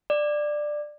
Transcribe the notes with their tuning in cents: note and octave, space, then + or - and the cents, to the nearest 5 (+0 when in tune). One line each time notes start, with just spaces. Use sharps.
D5 +15